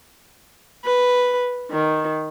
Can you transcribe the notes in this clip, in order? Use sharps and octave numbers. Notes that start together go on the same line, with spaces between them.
B4
D#3